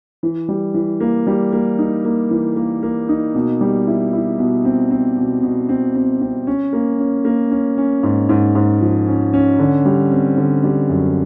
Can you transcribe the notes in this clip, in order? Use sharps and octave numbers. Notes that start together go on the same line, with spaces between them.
E3
G3
E3
A#3
G3
A#3
D#4
A#3
E3
A#3
A#3
D#4
B2
G3
E4
E4
B2
C4
C4
B2
B2
C4
C4
C4
C#4
A#3
C#4
A#3
C#4
C#4
G#2
G#2
G#2
F3
C#4
C#4
D3
G3
C4
D3
G3
F#2